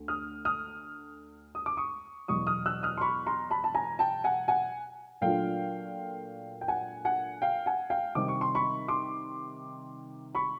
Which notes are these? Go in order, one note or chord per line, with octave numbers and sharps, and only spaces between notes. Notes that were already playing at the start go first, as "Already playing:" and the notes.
Already playing: D2
D#6 F6
D#6 F6
D#6
D6
C#6 D#6
E2 B2 F#3 C#6 D#6
D#6 F6
E6 F#6
D#6 F6
C6
B5 C#6
A#5 C6
A5 B5
A5
G#5 A#5
G5 A5
F#5 G#5
F#5 G#5
A#2 F#3 A3 D4 F4 F5 G5
G5
F#5 G#5
F#5 G#5
F5 G5
F#5 G#5
F5 G5
C3 D#3 G3 C4 D#4 D6
C#6
C6
B5 C#6
C6 D6
B5 C#6